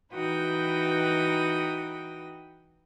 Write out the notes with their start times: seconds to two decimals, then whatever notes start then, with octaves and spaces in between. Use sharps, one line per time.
0.13 E3 D#4 F#4 B4 G5 D#6